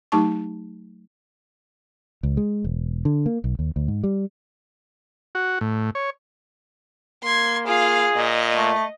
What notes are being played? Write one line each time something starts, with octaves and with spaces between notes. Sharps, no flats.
F#3 A3 D#4 G4 A5 C#6
C#2
G#3
E1
D3
A#3
B1
D#2
D2
G#2
G3
F#4
A2
C#5
A#3 C6 G#6
F4 G#4 F5
A#2 D#5
A3